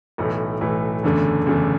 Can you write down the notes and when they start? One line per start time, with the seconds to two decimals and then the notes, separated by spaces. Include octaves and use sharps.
0.18 B1 A2 E3 A3
0.61 B1 A2 E3 A3
1.03 F#1 E2 D3 A3
1.46 F#1 E2 D3 A3